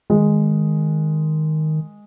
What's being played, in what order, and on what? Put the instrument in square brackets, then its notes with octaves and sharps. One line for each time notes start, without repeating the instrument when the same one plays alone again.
[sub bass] D#3 [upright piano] G#3